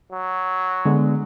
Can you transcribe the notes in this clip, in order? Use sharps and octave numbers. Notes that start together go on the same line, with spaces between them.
F#3
D3 G#3 B3